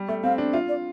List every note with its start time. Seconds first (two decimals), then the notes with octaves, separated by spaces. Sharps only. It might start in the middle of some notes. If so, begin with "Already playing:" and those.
Already playing: G3
0.09 A3 E5
0.24 C4 F5
0.38 D4
0.53 F4 E5
0.69 D5